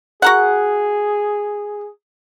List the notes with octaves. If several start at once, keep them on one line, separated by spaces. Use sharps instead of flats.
F#4 G#4 A#4 F#5